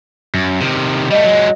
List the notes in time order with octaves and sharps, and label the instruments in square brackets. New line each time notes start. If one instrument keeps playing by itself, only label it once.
[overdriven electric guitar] F#2
C3 D#3
[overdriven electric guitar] G3 A3 [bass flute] D#5
[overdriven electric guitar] F#3 G#3